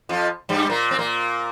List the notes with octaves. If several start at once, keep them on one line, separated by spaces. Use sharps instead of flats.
F2 F3
G2 G3
A#2 A#3
C4
A#2 A#3